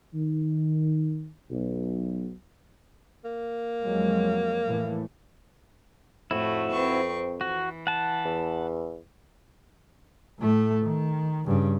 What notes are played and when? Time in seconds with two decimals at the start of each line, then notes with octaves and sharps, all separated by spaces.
0.14 D#3
1.50 B1
3.24 A#3
3.83 F2 F#3 G#3
4.65 A2 E3 A3
6.31 F2 A2 A3 E4 F#4
6.71 C4 B4 C#6
7.41 E3 F#4
7.87 F#5 A5
8.25 E2
10.39 A2 A3
10.86 D#3
11.46 G2 C#3